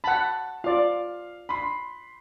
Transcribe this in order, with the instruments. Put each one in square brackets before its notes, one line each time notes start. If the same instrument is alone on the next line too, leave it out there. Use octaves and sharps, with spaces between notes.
[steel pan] F#5 B5 [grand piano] A5
[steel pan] F4 D5 [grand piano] F5
[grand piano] B5 C6